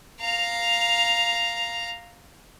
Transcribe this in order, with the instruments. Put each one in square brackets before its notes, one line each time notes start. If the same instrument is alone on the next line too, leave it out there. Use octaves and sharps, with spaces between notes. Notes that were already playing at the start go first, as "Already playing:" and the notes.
[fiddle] F5 A#5